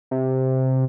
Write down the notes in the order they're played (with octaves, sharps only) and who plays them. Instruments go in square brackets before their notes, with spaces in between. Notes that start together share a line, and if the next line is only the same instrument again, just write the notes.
[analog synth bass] C3